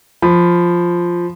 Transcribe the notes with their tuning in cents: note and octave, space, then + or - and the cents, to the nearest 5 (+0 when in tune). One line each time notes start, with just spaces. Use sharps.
F3 +0 B5 +15